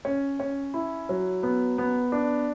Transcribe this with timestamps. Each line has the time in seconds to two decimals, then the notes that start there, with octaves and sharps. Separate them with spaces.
0.05 C#4
0.40 C#4
0.74 E4
1.09 F#3
1.43 B3
1.78 B3
2.12 D4